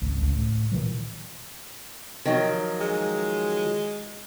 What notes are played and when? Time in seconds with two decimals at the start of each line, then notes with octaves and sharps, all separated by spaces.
0.01 G#1 C#2
0.22 C#2
0.35 A2
0.72 A#2 D#3 E3 F#3
2.25 D#3 F3 F#3
2.80 G#3